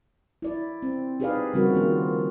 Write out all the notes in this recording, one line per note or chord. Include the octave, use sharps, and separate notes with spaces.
E4 D5
C4
D#4 G4 G#4 B4 D5 F5
C#3 F3 G3 C4 F#4 A#4
D#3 A#3 F4